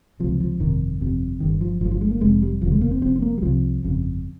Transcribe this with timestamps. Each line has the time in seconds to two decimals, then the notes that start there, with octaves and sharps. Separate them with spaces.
0.20 C#2 C3 F3
0.40 F3
0.60 G1 F2 C3 D#3
1.01 G1 F2 C3
1.40 G1 G2 D#3
1.61 F3
1.81 G1 F3
1.85 G2
1.91 F3
2.01 G#3
2.11 A#3
2.21 F1 F2 C3 G#3
2.42 G3
2.61 F1 D#2 C#3 F3
2.71 G#3
2.81 A#3
2.91 C4
3.01 F1 F2 C3 C4
3.16 C4
3.22 A#3
3.38 G3
3.42 C2 C3 F3
3.83 G1 F2 C#3